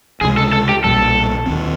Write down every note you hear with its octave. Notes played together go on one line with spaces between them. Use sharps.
C#2 C3 E3 G#3 G#4
A4
A4
G4
B1 A#2 G3 A4
D#2 D#3 G#3 C4